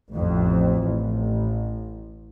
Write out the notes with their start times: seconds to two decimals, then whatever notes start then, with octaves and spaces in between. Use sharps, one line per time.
0.10 A1 F2
0.81 A1